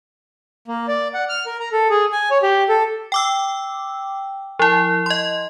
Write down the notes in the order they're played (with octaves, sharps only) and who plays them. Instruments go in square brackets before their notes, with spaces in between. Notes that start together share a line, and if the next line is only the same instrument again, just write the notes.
[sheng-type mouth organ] A#3
D5
F#5
F6
A#4
A#5
A4
G#4
G#5
C#5
G4
A4
[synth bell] G5 D6 E6
F3 E4
D#5 C6